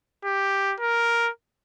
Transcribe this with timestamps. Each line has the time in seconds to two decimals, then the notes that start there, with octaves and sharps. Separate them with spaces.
0.25 G4
0.80 A#4